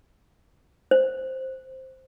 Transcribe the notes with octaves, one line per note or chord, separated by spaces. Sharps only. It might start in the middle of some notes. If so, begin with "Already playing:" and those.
C5